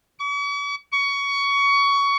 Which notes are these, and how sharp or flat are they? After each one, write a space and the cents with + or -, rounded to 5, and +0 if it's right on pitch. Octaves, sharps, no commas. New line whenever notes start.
C#6 +45
C#6 +20